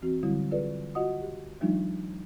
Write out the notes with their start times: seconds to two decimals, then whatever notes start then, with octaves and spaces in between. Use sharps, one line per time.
0.02 E3 C4 F#4
0.23 D3 F#3 G3 E4
0.51 F4 G#4 A4 B4 D5
0.95 F4 F#4 D#5 F#5 D#6
1.22 G4
1.61 E3 F#3 G#3 D4 D#4 F4